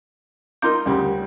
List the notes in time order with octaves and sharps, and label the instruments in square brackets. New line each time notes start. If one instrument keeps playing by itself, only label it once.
[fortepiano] D#4 F4 D6 [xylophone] A#4 C6 G6
[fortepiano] D2 C#3 G3